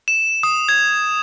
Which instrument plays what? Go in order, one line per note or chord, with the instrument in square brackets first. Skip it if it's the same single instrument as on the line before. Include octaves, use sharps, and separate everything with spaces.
[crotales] E7
D#6
G#6